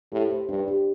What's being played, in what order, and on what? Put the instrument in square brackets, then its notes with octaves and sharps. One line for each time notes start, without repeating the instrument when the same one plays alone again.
[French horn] A2 [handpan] G4
[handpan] C5
[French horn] G2 [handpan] D4
[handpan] G4